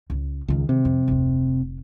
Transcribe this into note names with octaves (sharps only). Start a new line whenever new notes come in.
C#2
C#2 D#3 G#3
C3
F2
F1 D2